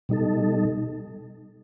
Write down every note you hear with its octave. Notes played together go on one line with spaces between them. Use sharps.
B2 G3 D#4 A4